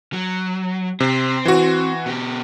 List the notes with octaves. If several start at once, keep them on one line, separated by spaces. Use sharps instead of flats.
F#3
C3 C4
E3 F#4
B2 G4